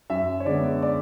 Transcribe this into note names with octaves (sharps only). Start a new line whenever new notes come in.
F#2 E5
C#5
D3 G#3 B3 D5
D5